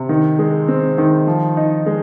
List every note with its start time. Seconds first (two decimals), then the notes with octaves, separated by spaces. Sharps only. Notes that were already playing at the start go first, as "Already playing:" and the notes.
Already playing: C3
0.09 D#3
0.39 G#3
0.68 C4
0.98 D#3
1.27 F3
1.57 D#4
1.86 G#3